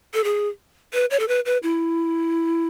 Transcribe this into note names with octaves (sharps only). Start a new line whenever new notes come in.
A4
G#4
B4
C#5
A4
B4
B4
E4